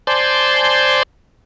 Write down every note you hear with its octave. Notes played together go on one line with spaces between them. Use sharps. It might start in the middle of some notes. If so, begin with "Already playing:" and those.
C5 D5 G#5 A5 C6 G6